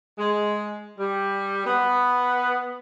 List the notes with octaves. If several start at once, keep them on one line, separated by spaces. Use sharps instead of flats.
G#3
G3
B3